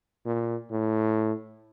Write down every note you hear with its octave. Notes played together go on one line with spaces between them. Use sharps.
A#2
A2